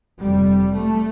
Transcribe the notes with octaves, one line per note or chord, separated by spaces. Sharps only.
F1 F2 C3 G3
A3